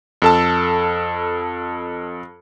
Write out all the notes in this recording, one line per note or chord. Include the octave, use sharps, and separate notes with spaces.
F2 A4 A5